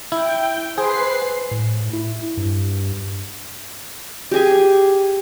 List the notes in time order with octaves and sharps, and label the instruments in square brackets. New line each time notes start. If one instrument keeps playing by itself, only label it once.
[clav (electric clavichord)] E4 [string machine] G5
[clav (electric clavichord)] G#4 [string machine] B4 C7 [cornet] C5
[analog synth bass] A2
E4
G2
[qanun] G4 G#4 G#5